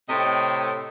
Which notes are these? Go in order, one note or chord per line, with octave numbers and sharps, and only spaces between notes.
A2 C3 C4 D#5